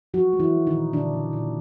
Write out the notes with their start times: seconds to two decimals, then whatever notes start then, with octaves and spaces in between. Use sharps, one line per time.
0.14 F3 F#3 F#4
0.33 G#3
0.40 E3 E4
0.54 G#3
0.67 D#3 D#4
0.73 A#2
0.93 A#2 D3 D4
1.13 A#2
1.33 A#2